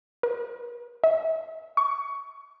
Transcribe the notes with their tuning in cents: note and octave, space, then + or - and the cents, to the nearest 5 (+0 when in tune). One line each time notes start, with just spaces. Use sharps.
A#4 +45
E5 -40
C#6 +15